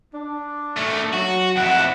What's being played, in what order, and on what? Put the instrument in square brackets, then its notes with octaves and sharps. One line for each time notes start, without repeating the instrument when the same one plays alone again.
[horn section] D4
[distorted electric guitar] D#3 A3
[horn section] F#3 [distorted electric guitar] F#4
[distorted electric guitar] F2 E4 [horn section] F#5